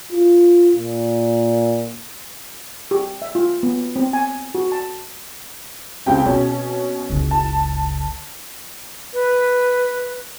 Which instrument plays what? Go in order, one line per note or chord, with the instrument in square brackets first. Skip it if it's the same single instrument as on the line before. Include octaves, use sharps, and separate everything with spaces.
[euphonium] F4
A#2
[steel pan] G4
E5
F4
B3
C4
G#5
F#4
A5
[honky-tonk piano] C#2 C3 G5
[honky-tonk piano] B2 C#4 [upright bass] C4
[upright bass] F#1 C#2
[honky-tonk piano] A5
[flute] B4